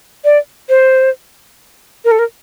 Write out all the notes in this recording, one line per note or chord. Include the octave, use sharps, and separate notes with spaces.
D5
C5
A#4
A4
A#4